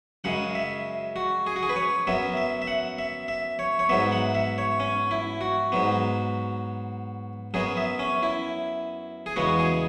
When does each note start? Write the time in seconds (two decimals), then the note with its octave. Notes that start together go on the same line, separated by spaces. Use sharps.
0.24 F#2 C#3 G#3 F#5
0.55 E5
1.16 F#4
1.47 G#4
1.56 F#4
1.63 G#4
1.69 B4
1.76 C#5
2.07 F#2 F#3 B3 E5
2.37 E5
2.62 E5
2.67 F#5
2.98 E5
3.28 E5
3.59 C#5
3.79 C#5
3.89 G#2 F#3 B3 E5
4.12 F#5
4.35 E5
4.58 C#5
4.80 C#4
5.11 E4
5.41 F#4
5.72 G#2 F#3 B3
7.54 F#2 F#3 B3 G#4
7.77 E5
7.99 C#4
8.23 E4
9.26 G#4
9.36 E2 C#3 G#3 B3 F#4
9.59 G#4